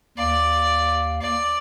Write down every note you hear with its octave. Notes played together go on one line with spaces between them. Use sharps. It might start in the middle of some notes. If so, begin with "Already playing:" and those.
D#2 D5 F5
D5